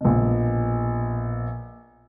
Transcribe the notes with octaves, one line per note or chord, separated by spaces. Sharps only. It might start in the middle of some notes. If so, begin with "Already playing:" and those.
A#1 B2